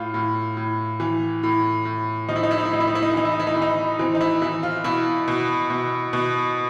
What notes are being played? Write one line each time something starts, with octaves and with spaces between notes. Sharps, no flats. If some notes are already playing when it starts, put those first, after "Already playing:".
Already playing: A2 F4
A2
A2
E3
A2
A2
F3 D#4
E4
D#4
E4
D#4
E4
A2 D#4
E4
D#4
E4
D#4
E4
E3 D#4
E4
D#4
E4
D#4
E3 E4
D#4
E3 C4
D#4
E4
E3 E4
F4
B2 E4
B2
B2
B2